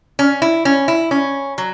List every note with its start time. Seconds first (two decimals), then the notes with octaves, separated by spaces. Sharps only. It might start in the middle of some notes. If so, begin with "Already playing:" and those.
0.19 C#4
0.42 E4
0.65 C#4
0.88 E4
1.11 C#4
1.58 F#3